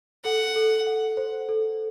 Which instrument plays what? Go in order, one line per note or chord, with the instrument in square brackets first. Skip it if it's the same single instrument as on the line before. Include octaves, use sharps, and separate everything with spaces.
[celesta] A4 [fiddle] F#5
[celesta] A4
F#5
C5
A4